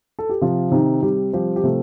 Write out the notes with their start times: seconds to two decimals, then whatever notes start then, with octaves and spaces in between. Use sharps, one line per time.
0.19 A4
0.29 G4
0.41 C3 F3 F4
0.72 C3 D#3 D#4
1.02 C3 G3 G4
1.33 F3 G3 G4
1.56 G4
1.64 C3 A3 A4